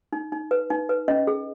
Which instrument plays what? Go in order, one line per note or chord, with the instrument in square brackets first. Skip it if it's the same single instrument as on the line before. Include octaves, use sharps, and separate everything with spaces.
[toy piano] D#4
D#4
B4
D#4
B4
C#4 D#5
G#4